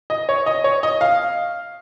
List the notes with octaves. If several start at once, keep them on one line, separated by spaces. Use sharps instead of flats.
D#5
C#5
D#5
C#5
D#5
F5